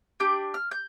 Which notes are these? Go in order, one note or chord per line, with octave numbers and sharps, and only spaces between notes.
D4 G4 G6
F6
G6